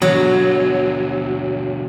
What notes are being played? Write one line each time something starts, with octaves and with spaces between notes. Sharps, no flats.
B2 D3 F#3